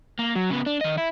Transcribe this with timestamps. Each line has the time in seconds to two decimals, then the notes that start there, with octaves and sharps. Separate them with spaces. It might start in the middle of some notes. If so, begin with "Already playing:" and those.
0.19 A#3
0.36 F#3
0.50 C#3 B3
0.66 D4
0.81 D#3 D#5
0.98 E4